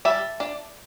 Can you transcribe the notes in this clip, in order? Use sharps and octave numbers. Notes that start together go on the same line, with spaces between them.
G3 E5 A5
D4